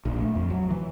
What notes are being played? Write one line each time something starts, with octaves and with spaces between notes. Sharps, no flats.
A#1
A3
F2
F#3
E3